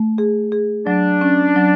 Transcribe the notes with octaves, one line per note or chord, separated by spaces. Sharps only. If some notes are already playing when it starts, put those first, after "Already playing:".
Already playing: A3
G#4
G#4
F#3 D4
C#4
F#3